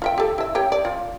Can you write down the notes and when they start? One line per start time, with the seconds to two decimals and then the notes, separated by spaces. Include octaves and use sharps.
0.02 F4 E5 G5
0.18 G4 A4
0.38 E4 E5
0.55 G4 C#5 G5
0.72 D5
0.85 F4